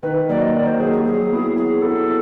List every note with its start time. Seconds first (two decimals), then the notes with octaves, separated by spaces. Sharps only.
0.03 D#3 B4
0.29 F#3 A#3 D5
0.42 D#5
0.54 D#3 D5
0.67 C5
0.80 F#3 A#3 G#4
0.93 G#4
1.00 G4
1.05 F#3 G#4
1.32 B3 E4
1.57 F#3 G#4
1.82 B3 E4 A4